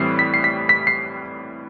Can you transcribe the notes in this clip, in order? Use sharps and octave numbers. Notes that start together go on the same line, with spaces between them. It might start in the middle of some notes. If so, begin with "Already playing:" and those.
Already playing: A2 E3 G3 C4 C7
B6
C7
B6
B6
C7